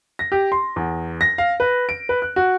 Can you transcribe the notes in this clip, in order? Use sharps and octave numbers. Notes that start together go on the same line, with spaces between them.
A#6
G4
C6
E2
A#6
F5
B4
D7
B4
F#6
F#4